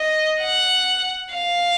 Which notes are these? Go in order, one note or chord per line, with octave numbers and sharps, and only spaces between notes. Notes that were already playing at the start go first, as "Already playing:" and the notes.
Already playing: D#5
F#5
F5